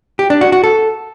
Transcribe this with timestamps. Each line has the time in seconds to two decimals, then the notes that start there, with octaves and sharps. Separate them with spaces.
0.19 G4
0.30 D4
0.41 F#4
0.52 F#4
0.64 A4